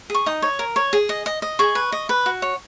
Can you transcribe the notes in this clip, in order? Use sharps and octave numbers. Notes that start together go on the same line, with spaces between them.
G#4 C#6
D#4 D#6
C#5
A#4
C#5
G#4
D#5
D#5
D#5
G#4 C#6
B4
D#5
B4
F#4
C#5